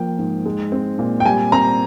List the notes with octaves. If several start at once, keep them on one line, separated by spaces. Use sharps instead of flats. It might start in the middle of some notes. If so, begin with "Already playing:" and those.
Already playing: F3 A#3 G5
G#2
G#3
C4
A#2
G5
G3 G#5
C4 A#5